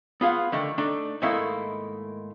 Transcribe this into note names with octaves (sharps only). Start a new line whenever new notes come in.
B3 F4 G#4 F5 F#5
D3 D#3 A3
A3 D4 D#4
G#2 D#3 A3 A#3 E4